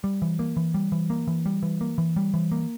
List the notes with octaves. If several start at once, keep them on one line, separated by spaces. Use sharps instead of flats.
G3
E3
A#3
E3
G3
E3
A#3
E3
G3
E3
A#3
E3
G3
E3
A#3